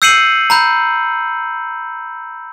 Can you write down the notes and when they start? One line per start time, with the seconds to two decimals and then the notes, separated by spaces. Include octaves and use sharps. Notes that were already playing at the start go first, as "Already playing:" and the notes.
0.02 E6 G6 C7 C#7 D#7 F#7
0.50 A#5 B5 G6